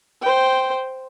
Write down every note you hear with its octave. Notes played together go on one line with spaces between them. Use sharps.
C5 G5